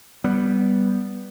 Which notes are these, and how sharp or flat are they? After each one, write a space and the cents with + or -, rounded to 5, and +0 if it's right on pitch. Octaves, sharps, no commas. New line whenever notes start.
G3 +0 B3 +0